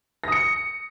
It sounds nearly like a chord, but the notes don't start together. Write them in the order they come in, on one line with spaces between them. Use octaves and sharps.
A#6 D#6 C#7